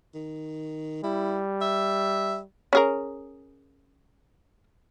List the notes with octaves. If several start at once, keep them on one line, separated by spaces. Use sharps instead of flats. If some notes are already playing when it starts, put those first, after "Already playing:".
D#3
G3 E4
E5
C#4 G#4 A#4